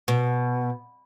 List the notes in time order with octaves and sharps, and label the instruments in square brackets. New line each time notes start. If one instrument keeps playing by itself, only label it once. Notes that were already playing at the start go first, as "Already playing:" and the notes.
[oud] B2